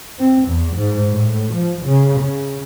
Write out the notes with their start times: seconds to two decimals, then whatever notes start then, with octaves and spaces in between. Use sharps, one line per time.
0.18 C4
0.47 E2
0.75 G#2
1.11 A2
1.54 F3
1.85 C#3
2.21 C#3